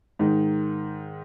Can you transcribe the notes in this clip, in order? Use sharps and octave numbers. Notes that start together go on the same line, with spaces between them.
G#2 D#3